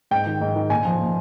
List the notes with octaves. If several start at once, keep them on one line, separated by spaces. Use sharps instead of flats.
G#2 G5
D#3
G#2
D#3
A#2 G#5
F3
A#2